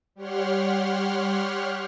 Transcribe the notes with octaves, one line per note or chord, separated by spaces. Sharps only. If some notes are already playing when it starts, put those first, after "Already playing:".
G3 G4 C#5 F#5 C6 F6